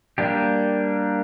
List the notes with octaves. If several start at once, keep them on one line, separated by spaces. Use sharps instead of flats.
G3 A#3 D4 G4